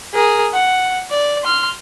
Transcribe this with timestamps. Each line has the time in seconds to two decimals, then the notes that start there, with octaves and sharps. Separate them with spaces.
0.14 G#4 A#4
0.54 F#5
1.11 D5
1.43 C6 F6